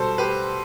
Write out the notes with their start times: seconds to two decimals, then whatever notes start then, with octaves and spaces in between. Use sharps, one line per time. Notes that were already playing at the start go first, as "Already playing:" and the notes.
Already playing: B2 G3 A4 C5
0.18 G4 B4